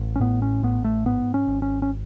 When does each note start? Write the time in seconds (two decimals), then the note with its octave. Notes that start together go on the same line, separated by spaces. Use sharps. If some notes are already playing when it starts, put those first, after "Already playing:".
Already playing: A1
0.16 C#4
0.20 A2 B3
0.42 C#4
0.63 A1 B3
0.84 A3
1.06 G#2 B3
1.34 C#4
1.47 G#1
1.62 C#4
1.82 C#4